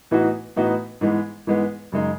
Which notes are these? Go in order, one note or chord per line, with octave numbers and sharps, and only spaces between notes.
A2 E3 B3 D#4 F#4
A2 E3 B3 D#4 F#4
G#2 E3 G#3 B3
G#2 E3 G#3 B3
F#2 C#3 G#3 D#4